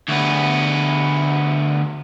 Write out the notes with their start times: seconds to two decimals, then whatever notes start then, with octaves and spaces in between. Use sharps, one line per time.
0.09 D2 B3